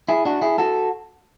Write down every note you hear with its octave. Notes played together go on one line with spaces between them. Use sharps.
E4 G#4
D4 F#4
E4 G#4
F#4 A4